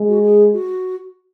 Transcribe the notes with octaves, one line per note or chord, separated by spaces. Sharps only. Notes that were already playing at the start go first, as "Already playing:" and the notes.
Already playing: G#3
F#4
G#4
F#4